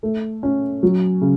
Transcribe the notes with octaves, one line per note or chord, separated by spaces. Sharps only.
A3
C#4
F#3
C#3